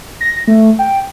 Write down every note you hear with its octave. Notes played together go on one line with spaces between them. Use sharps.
A#6
A3
G5